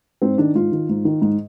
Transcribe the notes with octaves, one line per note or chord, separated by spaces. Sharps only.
G#2 C4
D#3 D4
G#2 F4
D#3
G#2
D#3
G#2